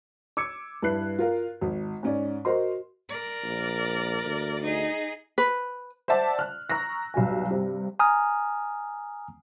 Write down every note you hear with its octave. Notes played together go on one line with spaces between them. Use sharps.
D6 E6 G#6 C#7
G2 E4 B4 F#6 C7
F4 A#4 F5
G#1
G#2 C#4 D5
F#4 A#4 C5 D#5 C6
A#4 D5
A#1
D2
D#4 G#4
B4
C5 D5 E5 F#5 A5 D6
F6 F#6
A#5 C#6 E6 F#6 A#6
B1 G2 F#4 G#5
G2 C3
G#5 A#5 D#6 F6